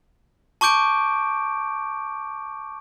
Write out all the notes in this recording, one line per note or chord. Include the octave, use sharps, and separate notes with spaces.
A5 C#6 D6 G6 D7